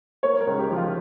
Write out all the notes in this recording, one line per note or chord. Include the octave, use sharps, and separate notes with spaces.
A#3 C#5
A#4
C#2
G4
F3
F4